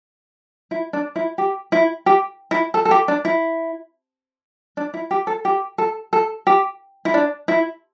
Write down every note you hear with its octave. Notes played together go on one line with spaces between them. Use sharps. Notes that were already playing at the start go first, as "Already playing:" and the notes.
E4
D4
E4
G4
E4
G4
E4
A4
A4
G4
D4
E4
D4
E4
G4
A4
G4
A4
A4
G4
E4
D4
E4